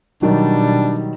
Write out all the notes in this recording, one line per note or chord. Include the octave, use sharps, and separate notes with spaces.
B2 D#3 F#3 G3 D4